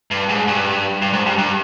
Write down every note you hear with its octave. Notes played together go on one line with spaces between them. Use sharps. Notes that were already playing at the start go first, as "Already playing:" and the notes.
G2
G#2
G2
G2
G#2
G2
G2